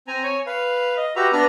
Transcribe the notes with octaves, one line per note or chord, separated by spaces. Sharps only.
C4 G#5 A#5
C#5 G#5
B4 F5
D#5
F#4 G4 B4 E5 A#5
B3 D4 B4 A#5 F6